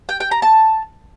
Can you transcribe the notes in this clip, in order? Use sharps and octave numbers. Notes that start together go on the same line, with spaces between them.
G5
G5
A#5
A5